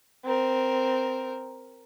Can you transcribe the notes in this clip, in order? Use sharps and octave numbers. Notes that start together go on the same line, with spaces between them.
C4 A#4